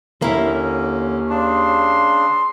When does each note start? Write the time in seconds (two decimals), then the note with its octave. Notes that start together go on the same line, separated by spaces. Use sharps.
0.22 D#2 D3 A#3 C#4 E4
1.29 C#3 D4 C6